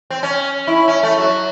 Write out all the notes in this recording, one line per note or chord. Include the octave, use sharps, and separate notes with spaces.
C4
C#4
E4
C#4
A3
F#3